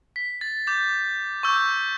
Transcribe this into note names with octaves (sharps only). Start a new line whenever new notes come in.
B6
A6
D6 G6 A6
C#6 E6 G6